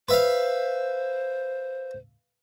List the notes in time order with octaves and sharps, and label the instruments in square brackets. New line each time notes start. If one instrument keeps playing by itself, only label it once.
[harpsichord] B4 E5 F5 [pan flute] C5